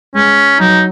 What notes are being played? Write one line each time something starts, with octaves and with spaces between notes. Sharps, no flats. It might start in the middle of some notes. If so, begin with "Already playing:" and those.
G#3 C#4
F#3 D#4